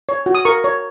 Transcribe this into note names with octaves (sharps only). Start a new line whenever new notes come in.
C#5
F#4
D#6
A#4 C#6
C#5